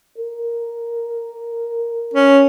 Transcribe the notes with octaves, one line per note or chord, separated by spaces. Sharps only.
A#4
C#4